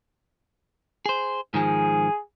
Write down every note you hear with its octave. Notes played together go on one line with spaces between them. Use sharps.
G#4 C5
G#2 D#3 F3 G#4